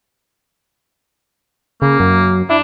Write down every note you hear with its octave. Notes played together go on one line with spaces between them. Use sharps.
C#3 A#3
F#2
D4 E4